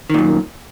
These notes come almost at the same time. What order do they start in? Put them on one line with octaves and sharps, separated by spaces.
D#3 A#2 F#2